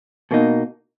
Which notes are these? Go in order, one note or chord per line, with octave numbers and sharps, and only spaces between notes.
B2 A#3 D#4